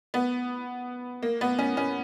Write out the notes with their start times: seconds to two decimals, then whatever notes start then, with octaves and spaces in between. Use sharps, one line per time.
0.14 B3
1.23 A#3
1.41 B3
1.59 C#4
1.77 C#4